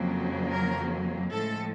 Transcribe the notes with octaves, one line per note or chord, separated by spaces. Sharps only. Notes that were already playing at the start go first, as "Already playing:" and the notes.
Already playing: F2 C#3 F#3 A#3
A#4
A2 F3 G#3 A4